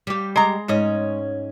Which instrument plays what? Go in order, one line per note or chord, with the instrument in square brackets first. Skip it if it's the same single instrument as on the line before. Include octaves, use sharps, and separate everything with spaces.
[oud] G3 G4
[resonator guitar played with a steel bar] G#3 A#5
[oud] G#2 C#4 D#5